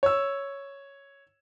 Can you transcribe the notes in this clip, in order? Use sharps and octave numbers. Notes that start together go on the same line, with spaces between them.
C#5 E6